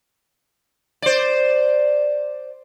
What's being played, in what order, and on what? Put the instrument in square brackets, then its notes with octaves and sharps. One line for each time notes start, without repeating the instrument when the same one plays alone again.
[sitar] C5 D5